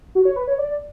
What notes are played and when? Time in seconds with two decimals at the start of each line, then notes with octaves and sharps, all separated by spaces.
0.15 F#4
0.25 C#5
0.36 B4
0.47 C#5
0.58 D5